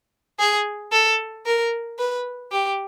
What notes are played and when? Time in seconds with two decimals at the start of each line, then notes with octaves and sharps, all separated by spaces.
0.39 G#4
0.92 A4
1.46 A#4
1.99 B4
2.52 G4